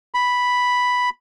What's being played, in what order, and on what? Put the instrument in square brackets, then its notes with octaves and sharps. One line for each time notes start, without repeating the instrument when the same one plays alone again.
[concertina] B5